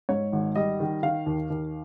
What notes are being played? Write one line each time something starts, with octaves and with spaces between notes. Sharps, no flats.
G#2 C#5
G#1
G3 D#5
D#3
D#3 F5
D#2
D#2